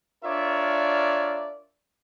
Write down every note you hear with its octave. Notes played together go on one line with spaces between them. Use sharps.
D4 F4 A#4 C#5 D5 E5